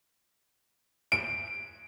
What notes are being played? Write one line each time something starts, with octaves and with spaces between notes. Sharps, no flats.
D7